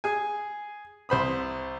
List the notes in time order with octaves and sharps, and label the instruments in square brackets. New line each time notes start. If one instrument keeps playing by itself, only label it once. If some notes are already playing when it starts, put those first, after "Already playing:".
[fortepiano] G#4 G#5
C2 C5 B5 D#6